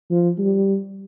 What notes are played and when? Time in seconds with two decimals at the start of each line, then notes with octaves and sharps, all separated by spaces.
0.10 F3
0.39 G3